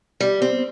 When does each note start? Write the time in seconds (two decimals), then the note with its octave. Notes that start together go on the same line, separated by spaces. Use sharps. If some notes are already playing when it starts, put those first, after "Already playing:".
0.20 G3
0.42 C4